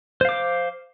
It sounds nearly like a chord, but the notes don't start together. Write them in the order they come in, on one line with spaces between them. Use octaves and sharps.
C5 F5 D6